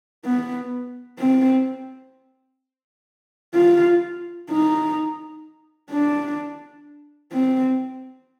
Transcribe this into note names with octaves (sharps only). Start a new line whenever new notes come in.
B3
C4
F4
D#4
D4
C4